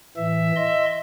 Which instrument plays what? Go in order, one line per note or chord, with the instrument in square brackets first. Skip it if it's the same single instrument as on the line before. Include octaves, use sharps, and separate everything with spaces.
[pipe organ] A2 E3 [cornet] E5
[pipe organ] D#5 C6